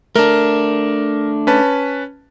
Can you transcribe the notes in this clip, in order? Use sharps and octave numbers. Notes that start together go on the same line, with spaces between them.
A3 D4 A#4
C#4 B4 A5